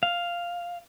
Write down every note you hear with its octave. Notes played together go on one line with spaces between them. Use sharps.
F5